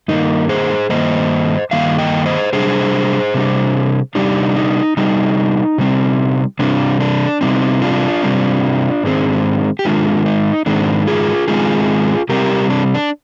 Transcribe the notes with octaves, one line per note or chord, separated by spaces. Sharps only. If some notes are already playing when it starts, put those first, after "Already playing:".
G2 D#3 A#3 D#4
G#4 C5
G2 D#3 A#3 C5 D#5
G2 D#3 A#3 F5
D#5 G5
C5 D#5
C3 G3 D4 G#4 C5
C3 G3 D4
C3 G3 D4 D#4 G4
D#4
C3 G3 D4 D#4
C3 G3 C4
C3 G3 C4 D4
D4
C3 G3 C4 D#4
D4 F4
C3 G3 C4
G#2 D#3 G#3 C4
G4
G#2 D#3 G#3 D4 F4
D#4
G#2 D#3 G#3 C4 D4
F4 G#4
G#2 D#3 G#3 C4 F4 G#4
C3 G3 C4 G4 A#4
D4
D4